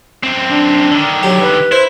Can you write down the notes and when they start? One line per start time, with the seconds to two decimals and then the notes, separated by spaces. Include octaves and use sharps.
0.23 F#2 C4
0.49 D4
0.92 D3 D#3
1.23 F#3 G4
1.42 B4
1.72 E4 C5